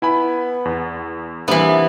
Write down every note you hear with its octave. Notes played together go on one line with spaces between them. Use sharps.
B3 E4 G#5 B5
E2
C3 E3 G3 A#3 B3 D4